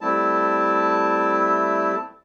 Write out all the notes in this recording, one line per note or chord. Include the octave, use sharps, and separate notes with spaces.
G3 A3 C4 E4 A5